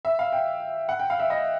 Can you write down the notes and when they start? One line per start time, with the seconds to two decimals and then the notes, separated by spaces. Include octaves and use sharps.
0.05 E5
0.19 F5
0.32 G5
0.89 F#5
0.99 G5
1.10 F5
1.20 E5
1.30 D#5